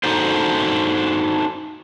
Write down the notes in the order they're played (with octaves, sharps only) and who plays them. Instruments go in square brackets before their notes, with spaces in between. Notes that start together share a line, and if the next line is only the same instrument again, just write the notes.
[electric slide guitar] D4 D#4 F#4 G#4 A4 C5